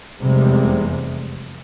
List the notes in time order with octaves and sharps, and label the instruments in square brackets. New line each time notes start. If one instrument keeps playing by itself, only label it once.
[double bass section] F1 E2 C3 G3 G#3